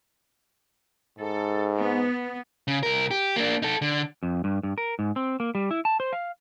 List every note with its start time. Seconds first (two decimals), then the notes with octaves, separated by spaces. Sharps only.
1.19 G#2 A4
1.78 B3
2.68 C#3
2.83 C2 A#4
3.11 G4
3.36 A#3 D4
3.62 D#4 A4
3.82 D3
4.23 F2
4.44 G2
4.63 G2
4.78 A#4
4.99 G#2
5.16 C4
5.40 A#3
5.55 G3
5.71 E4
5.85 A5
6.00 C5
6.13 F5